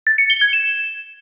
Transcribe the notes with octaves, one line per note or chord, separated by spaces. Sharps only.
A6
C#7
G7
G#6
E7